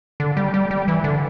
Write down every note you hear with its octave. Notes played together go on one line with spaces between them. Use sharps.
D3
G3
G3
G3
E3
D3